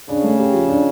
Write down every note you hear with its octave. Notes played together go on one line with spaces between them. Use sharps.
C#3 D4
A3
G4
F3
D4